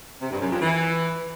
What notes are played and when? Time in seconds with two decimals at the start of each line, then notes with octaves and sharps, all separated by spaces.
0.20 C3
0.30 G2
0.40 F#2
0.51 F2
0.61 E3